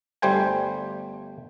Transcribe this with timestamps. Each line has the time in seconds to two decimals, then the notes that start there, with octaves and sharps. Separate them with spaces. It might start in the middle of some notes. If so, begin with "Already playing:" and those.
0.22 G1 G3 A3 C5 G5 G#5